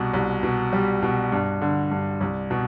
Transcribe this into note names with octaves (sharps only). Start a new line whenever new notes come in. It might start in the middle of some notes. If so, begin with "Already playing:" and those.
Already playing: C2 B2
C2
B2
G3
B2
G2
D3
G2
C2
B2